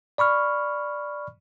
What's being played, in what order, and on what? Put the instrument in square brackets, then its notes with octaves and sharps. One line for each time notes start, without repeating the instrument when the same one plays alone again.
[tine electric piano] D5 B5 C#6 F6